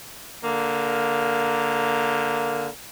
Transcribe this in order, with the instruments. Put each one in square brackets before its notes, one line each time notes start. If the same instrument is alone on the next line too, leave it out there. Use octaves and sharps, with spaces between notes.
[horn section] D3 A#3